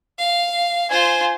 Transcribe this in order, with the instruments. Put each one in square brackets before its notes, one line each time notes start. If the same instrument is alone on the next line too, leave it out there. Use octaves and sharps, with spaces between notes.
[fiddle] F5
[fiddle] F4 C5 [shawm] G#5